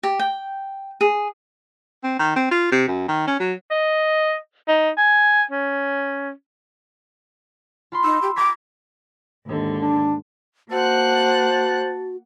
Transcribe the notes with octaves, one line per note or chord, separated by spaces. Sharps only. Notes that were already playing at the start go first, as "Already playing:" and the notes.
G4
G5
G#4
C4
D#3
C4
F4
C3
F#2
D#3
C#4
F#3
D#5
D#4
G#5
C#4
F4 B5 C6
D#4 E6
G4
A#5 D6 G#6 B6
D#2 G#2 D3
D4
A#3 F#4 C5 F#5 A5 F#6